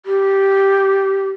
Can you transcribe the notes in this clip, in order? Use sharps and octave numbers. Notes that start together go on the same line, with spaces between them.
G4